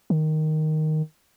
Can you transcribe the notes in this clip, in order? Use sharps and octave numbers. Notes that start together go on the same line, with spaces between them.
D#3